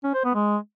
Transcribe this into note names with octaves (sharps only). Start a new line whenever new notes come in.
C#4
C5
B3
G#3